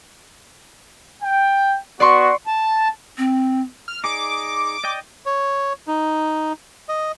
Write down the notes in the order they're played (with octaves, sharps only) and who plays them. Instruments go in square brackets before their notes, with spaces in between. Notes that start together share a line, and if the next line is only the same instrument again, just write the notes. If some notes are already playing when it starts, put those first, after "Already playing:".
[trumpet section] G5
[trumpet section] B3 F#4 [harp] D5 C6 C#6
[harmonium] A5
[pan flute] C4
[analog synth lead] F6
[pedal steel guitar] D#4 G#4 D5 [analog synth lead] D6
[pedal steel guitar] D5 D#5 G5
[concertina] C#5
D#4
D#5